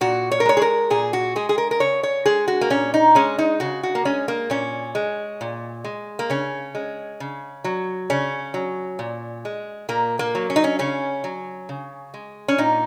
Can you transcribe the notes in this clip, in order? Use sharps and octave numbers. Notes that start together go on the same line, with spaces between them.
A#2 F#4
C#5
A#4
G#3 C#5
G#4
A#4
A#2 G#4
F#4
G#3 G#4
G#4
A#4
A#4
C#3 C#5
C#5
G#3 G#4
F#4
A#3
A#2 C#4
D#4
G#3 C#4
D#4
C#3 F#4
F#4
A#3
G#3 C#4
A#3
A#2 C#4
G#3
A#2
G#3
A#3
C#3 C#4
G#3
C#3
F#3
C#3 C#4
F#3
A#2
G#3
A#2 A#3
A#3
F#3
C#4
D#4
C#4
C#3 C#4
F#3
C#3
G#3
C#4
A#2 D#4